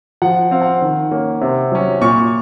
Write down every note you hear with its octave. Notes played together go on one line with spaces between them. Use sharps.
F3 F#5
C4 F5
F#5
D#3
A#3 C#4
C3
F#3 C#4
A#2 C#6